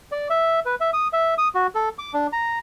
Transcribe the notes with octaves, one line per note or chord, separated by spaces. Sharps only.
D5
E5
B4
E5
D#6
E5
D#6
F#4
A4
D6
D4
A#5